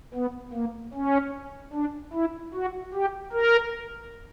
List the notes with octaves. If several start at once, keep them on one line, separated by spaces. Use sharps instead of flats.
B3
A#3
C#4
D4
E4
F#4
G4
A#4